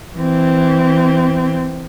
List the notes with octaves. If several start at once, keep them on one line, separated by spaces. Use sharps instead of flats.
E3 C4